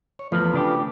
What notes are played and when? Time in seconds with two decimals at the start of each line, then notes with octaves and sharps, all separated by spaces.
0.19 C#5
0.32 E2 F3 A3 F4 B4
0.53 C#3 D4 G4